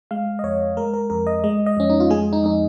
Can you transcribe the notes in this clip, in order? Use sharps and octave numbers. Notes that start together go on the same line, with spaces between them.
G#3 F5
D#5
F2 C#5
G#3 A#4
A#4
F2 A#4
D#5
G#3 D#5
D#5
F2 C#4
D#4
F4
G#3 G#4
D#4
F2 D#4